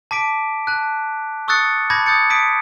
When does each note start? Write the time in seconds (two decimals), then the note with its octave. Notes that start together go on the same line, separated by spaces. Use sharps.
0.11 A5 D6 B6 D7
0.67 A5 F#6
1.48 C#6 D#6 E6 F#6 A6 C#7
1.90 A5 B5 D6 G6 G#6 A#6
2.06 D#6 G6 A6 C#7
2.30 A5 D#6 B6 D7